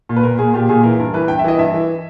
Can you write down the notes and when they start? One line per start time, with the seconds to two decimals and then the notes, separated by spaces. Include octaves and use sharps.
0.09 A#2
0.16 B4
0.23 A#2 A#4
0.38 A#2 G#4
0.54 A#2 G4
0.69 A#2 G#4
0.83 E3 A#4
0.99 G2 A#4
1.14 E3 B4
1.28 G2 G5
1.39 E5
1.44 E3 D#5
1.58 G2 E5
1.74 E3